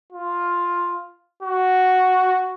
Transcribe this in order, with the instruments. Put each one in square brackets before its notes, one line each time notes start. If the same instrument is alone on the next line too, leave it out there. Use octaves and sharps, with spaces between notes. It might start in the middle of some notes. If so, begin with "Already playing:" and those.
[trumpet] F4
F#4